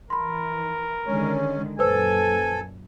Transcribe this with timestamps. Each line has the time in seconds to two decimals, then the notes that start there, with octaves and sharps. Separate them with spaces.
0.10 E3 A#4 B5 C6
1.06 D3 D#3 G#3 C#4
1.79 F#2 A#2 A4 B4 C5 G#5 E6